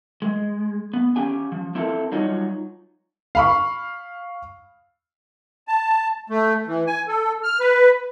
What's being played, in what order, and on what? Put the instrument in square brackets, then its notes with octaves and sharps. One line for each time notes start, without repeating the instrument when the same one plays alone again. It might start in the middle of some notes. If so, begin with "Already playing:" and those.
[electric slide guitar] G#3
B3
C#4 G4 G#5
F3
C4 E4 F4 G4 A4 A#4
F#3 G3 D#4 F4 C#5
[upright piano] F5 B5 C#6
[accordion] A5
A3
E3
G#5
A4
F6
B4